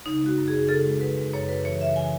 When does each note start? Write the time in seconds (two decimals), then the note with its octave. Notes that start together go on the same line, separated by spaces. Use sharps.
0.06 C#3 D#4
0.22 G#3 F#4
0.38 F#2
0.48 G#4
0.54 C#3
0.69 C#3 A4
0.86 G#3
1.01 G#3 B4
1.17 G#3
1.33 F#2 C#5
1.48 F#2 B4
1.64 E3 C#5
1.81 C#3 E5
1.96 E3 G#5